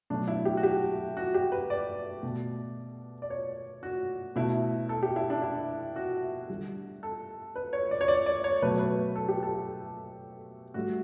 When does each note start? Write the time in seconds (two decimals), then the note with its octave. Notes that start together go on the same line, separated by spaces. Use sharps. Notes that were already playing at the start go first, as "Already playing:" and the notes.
0.10 B2 F#3 A3 D4
0.28 E4
0.45 G4
0.57 F#4
0.63 G4
1.17 F#4
1.34 G4
1.52 B4
1.70 D5
2.23 B2 A3
3.22 D5
3.30 C#5
3.83 F#4
4.36 B2 A3 E4
4.89 A4
5.03 G4
5.16 E4
5.30 D4
5.42 E4
5.96 F#4
6.50 D3 G3
7.03 A4
7.56 B4
7.73 C#5
7.91 D5
8.01 C#5
8.08 D5
8.26 D5
8.44 C#5
8.62 B2 F#3 A3 B4
8.79 B4
9.16 A4
9.29 G4
9.43 A4
10.74 A2 G3 F#4